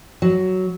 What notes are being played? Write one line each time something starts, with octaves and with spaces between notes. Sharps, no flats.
F#3